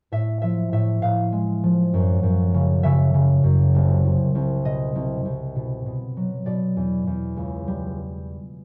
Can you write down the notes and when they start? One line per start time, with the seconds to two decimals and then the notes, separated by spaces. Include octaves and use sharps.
0.12 A2 E5
0.42 F3 E5
0.72 A2 E5
1.02 A2 F5
1.32 G#3
1.63 F3
1.94 F#2
2.23 F#2
2.54 C#3
2.83 C#3 E5
3.14 C#3
3.44 F#2
3.75 C2
4.04 C2
4.35 C2
4.65 B2 D#5
4.95 C2
5.25 C2
5.56 B2
5.86 B2
6.17 F#3
6.46 B2 D5
6.76 E2
7.07 E2
7.37 C#2
7.68 G3